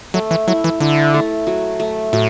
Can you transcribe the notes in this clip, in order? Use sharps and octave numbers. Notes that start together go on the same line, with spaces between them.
F#3 A3
E3
F#3 E4
E3
D3 E4
A3
F#3
A3
A2 F#3